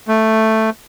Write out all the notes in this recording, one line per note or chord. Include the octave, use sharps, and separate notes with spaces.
A3